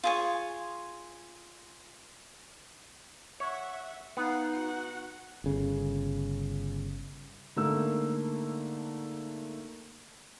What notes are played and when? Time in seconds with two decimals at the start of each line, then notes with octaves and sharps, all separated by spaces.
0.04 F4 G#4 C#5
3.40 C#5 E5 F#5
4.17 B3 D#4 F5 F#5
4.52 F#4 F#5
5.44 G1 C#3
7.56 G#2 D3 A3 A#3 E6